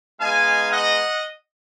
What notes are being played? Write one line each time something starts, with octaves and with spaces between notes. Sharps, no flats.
G#3 B3 D#4 F5 G#5
D#5 F#5